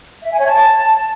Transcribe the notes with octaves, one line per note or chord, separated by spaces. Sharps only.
E5
G#5
C#5
A5